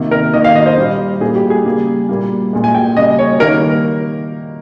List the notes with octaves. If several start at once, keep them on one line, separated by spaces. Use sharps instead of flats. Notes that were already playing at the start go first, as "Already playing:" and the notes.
Already playing: C3 D#3 A#3
A#4
D#3 A#3 D#5
F5
D#5
C5
A#2 G3 A#3
A#2 G3 A#3 G#4
G4
G#4
C#3 G3 A#3
A#2 G3 A#3
A#2 G#3
G#5
G5
C#3 G3 A#3 D#5
C#5
D#3 G3 A#3 A#4